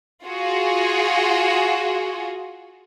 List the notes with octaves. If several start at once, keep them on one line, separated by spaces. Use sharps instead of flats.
F4 F#4 G#4